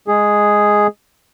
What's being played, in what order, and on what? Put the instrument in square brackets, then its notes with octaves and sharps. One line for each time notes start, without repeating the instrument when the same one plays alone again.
[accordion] G#3 G#4